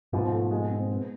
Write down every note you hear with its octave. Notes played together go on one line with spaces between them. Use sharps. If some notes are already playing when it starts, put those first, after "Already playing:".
G#2 B2 F3
A3
G#3
C4
B3